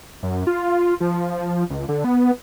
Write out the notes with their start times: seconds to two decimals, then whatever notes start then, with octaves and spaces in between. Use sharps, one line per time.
0.23 F#2
0.47 F4
1.00 F3
1.70 C#2
1.89 D3
2.04 B3